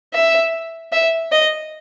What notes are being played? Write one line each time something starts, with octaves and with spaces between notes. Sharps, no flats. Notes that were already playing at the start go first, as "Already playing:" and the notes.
E5
E5
D#5